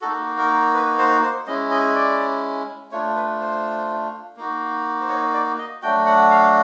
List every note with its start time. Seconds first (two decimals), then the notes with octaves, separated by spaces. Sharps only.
0.01 A#3 D#4 F#4 A4
0.38 A#4
0.74 B4
0.98 C5
1.23 C5
1.47 G#3 C#4 E4 D#5
1.71 D#5
1.95 D5
2.92 A3 D4 F4 C#5
3.16 B4
3.40 C5
4.36 A#3 D#4 F#4
5.01 C5
5.09 C#5
5.33 D5
5.58 D#5
5.82 F#3 A3 D4 F#4 G5
6.06 F#5
6.31 F5